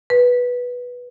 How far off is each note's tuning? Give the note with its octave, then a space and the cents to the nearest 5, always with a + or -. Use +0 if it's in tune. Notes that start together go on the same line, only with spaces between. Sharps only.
B4 -10